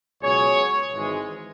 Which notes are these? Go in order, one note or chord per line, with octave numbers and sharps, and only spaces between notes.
C#2 B2 F#3 G#4 C#5
G#1 G#2 E3 G#3